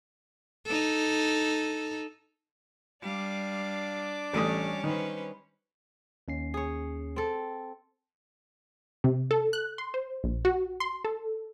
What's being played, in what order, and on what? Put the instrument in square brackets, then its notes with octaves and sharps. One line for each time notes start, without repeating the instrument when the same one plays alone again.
[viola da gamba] D#4 A4
[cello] G3 F5 [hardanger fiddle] D4 D6
[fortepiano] A1 A3 D#6 [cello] G3 C#4
[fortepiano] D#3 [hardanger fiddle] B4 C5
[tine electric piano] D#2 C#4 C7
[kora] G#4 C#5
C4 A4
[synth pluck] C3
A4
F#6
C6
C5
A#1
F#4
C6
A4